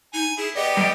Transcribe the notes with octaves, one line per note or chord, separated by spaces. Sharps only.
D#4 G#5
E4 G#4
B3 G4 D5 D#5
G3 G5